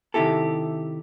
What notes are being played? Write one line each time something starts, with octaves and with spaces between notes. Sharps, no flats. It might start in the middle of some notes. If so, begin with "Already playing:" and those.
C3 D#3 E4 G4 A4